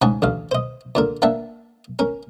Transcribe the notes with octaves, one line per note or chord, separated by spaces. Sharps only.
G#2 C#3 F#5 G#5 A5
A1 D2 F5
C5 D#5
A#2 D3 A#4
A#3 D4 E5 F#5 A5
C#4 A#4